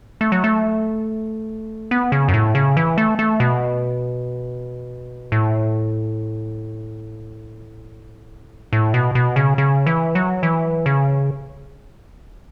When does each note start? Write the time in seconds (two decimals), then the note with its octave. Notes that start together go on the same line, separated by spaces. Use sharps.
0.21 A3
0.32 F#3
0.44 A3
1.91 B3
2.12 C#3
2.28 F#2
2.34 A2
2.55 C#3
2.77 E3
2.98 A3
3.19 A3
3.40 B2
5.32 A2
8.73 A2
8.94 B2
9.15 B2
9.36 C#3
9.58 C#3
9.86 E3
10.15 F#3
10.43 E3
10.86 C#3